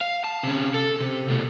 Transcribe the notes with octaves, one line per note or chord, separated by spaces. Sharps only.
F5
A5
C3 C#4
A4
C3
B2 A3